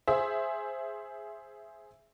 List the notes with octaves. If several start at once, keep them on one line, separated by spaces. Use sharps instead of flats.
G#4 C5 E5